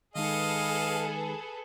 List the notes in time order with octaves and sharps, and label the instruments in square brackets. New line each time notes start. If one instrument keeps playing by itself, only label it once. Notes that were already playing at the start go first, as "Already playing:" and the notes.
[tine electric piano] D#3 G#3 D#4 [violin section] G#4 A4 B4 [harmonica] D#5 F5